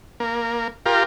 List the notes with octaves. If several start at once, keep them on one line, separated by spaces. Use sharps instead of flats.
A#3
F4 G4 A#4